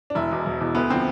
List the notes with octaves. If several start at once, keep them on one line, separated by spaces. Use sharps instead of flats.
D4
E1 E4
E2 B2
E1
E2 B2
D2 B3
D3 F3 C4